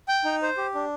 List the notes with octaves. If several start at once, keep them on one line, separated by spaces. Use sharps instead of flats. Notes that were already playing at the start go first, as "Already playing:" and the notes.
G5
D#4
C5
G4
D4